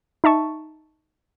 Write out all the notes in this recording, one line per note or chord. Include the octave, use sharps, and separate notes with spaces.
D#4 E5 A5 C#6